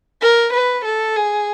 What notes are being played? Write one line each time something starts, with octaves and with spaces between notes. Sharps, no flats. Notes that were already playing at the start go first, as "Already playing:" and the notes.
A#4
B4
A4
G#4